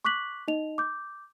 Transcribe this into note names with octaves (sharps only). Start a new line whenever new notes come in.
C#6 D6 F#6 B6 F#7
D#4 D#5 F7
D6 G6